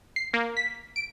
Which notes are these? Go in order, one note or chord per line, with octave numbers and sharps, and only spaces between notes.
C7
A#3
B6
D7